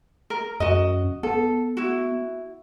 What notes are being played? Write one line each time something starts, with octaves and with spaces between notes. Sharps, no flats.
A#4
F#2 F#4 D#5
B3 A4
E4 F#4